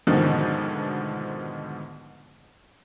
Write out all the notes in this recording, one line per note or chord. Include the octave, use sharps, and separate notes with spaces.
D2 G#2 B2 D3 D#3 F3